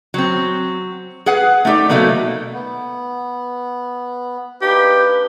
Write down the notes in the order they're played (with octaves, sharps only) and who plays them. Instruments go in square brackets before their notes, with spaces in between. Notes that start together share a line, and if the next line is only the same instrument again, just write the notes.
[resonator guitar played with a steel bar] F#3 C4
G#4 B4 F#5
A3 D#4 G4 D5
B2 F#3 A3 A#3 D#4
[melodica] B3
[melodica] A#3 D4 D#4 [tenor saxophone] G4 [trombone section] B4